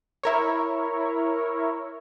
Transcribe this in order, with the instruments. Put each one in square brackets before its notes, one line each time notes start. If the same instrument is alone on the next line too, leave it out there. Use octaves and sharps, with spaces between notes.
[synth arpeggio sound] E4 A#4 C#5